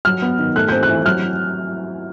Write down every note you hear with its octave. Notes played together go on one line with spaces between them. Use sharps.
F#3 F6
B3
D#3
A3 F#6
C4 G6
F#6
E3
F#3 F6